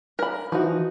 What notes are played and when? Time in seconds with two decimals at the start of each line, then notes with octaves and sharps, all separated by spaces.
0.19 A#4 B5
0.52 E3 F3 D#4 F#4